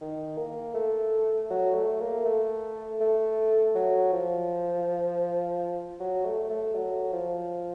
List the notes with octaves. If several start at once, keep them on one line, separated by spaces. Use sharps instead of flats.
D#3
A#3
A3
F#3
A3
A#3
A3
A3
F#3
F3
F#3
A3
A3
F#3
F3